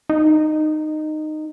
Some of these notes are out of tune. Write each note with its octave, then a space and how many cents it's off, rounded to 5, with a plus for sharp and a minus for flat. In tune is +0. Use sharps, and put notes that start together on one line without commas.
D#4 -15